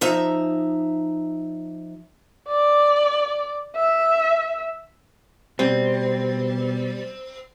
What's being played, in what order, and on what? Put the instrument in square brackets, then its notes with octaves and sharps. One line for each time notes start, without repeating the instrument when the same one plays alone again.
[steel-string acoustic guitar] F3 D#4 E5 A#5
[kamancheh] D5
E5
[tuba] B2 [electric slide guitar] G3 [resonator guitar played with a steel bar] C4